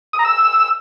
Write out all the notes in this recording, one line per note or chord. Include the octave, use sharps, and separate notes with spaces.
D#6
A#5
E6